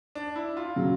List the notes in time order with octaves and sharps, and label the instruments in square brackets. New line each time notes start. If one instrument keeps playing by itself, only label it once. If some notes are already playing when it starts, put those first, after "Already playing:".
[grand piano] D4
E4
F4
[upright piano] C#3 F#3